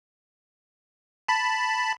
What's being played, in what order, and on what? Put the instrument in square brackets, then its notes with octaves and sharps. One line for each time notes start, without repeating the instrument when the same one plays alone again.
[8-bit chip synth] A5 B5